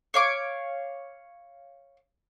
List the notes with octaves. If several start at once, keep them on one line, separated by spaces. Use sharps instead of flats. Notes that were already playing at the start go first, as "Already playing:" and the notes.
C#5 F5 D6